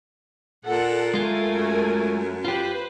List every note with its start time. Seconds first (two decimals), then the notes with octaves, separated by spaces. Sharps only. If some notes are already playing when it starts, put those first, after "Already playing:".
0.65 A#2 A4 F#5
1.14 G#3 A3 F4 A#4 G#5
1.47 F#2
2.45 F4 G4 B4 C5